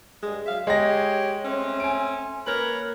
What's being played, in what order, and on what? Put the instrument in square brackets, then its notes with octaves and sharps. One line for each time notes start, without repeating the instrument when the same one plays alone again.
[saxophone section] G2 G#3
F#3 E5 F5
[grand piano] G#3 A#6 [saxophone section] G4 C#5
[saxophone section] A3 C4 C#4
[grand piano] G#5 D7
[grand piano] A#3 [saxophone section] A#4 B4 C#5